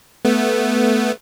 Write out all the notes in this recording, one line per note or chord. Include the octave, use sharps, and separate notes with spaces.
A3 B3